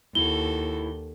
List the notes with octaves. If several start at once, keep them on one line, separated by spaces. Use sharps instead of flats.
D#2 E4 F#4 A4 G7